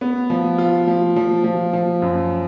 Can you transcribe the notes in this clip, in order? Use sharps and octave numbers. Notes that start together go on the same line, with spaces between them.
B3
F3
F4
F3
F3
F3
F3
F#2